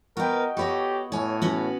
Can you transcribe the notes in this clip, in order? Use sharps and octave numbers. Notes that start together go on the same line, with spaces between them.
B3 F#4 A#4 B4 D#5 G5
B3 F#4 G4 A4 C#5 D#5
A2 C#5 G#5
B3 C#4 F#4